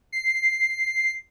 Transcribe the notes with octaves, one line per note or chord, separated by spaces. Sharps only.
C7